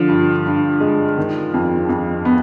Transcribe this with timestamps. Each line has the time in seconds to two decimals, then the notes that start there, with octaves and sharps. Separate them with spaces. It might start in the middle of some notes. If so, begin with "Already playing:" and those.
Already playing: D3 F3 F4
0.08 G2
0.46 G2
0.80 G#3
1.18 D#3
1.54 F2
1.89 F2
2.25 B3